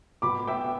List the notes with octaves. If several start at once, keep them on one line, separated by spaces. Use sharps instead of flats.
B2 B5 D6
B3 E5 G5